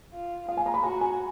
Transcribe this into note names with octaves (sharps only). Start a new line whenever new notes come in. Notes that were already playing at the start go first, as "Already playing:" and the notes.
F4
F4 F5
G#5
A#5
B5
F#4 A#5
G#5